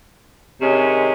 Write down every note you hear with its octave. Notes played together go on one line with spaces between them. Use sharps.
C3 D#3 G#3 C#4